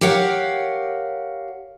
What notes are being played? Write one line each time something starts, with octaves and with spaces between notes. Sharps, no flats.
G4 A#4 C#5 F5 F#5